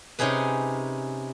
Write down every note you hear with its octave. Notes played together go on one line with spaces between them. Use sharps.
C3 C#4 D#4 G#4 B4